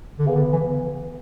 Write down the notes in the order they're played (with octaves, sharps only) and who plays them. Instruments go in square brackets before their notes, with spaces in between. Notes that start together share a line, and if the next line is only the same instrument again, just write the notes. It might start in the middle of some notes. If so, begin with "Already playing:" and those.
[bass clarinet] D3
[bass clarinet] C#3 [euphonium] B3
[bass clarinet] D3
E3